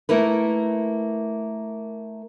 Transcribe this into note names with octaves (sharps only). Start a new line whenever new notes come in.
A3 A#3 E4 A#4 B4